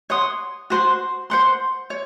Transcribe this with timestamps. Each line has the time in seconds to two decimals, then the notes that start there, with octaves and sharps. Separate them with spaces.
0.10 C#5 F#5 C6 D#6
0.70 F#4 C5 F#5 C6
1.30 C5 F#5 C6
1.90 C#5